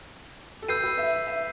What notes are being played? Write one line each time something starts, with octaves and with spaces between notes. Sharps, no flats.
A4
B4 E6 G6 C7 D#7
B4
E5
E5